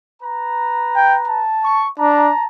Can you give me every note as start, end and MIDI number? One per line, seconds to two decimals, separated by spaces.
0.23 1.44 71
0.23 1.44 82
0.95 1.17 79
1.28 1.86 81
1.64 1.88 85
1.99 2.31 62
1.99 2.47 81
1.99 2.47 82